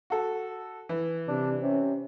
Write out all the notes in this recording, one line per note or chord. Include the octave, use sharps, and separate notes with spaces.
F#4 A4
E3
C3 D4
C3 C#4